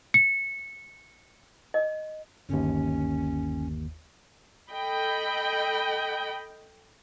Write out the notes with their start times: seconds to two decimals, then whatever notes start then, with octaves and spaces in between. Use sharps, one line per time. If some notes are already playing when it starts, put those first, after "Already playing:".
0.14 C#7
1.74 D#5
2.49 G1 D#2 C#4
4.71 A4 D#5 G5 B5